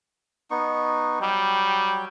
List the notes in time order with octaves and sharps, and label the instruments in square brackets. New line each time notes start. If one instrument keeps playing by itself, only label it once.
[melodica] B3 D#4 C#6
[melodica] F#3 G5 [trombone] G3